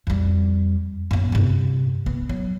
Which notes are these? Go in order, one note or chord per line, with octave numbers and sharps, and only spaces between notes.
F2 G3
F#2 B3
G2 C3
B3
F#3